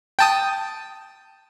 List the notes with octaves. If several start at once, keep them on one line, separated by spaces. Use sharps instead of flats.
G5 A5 D#6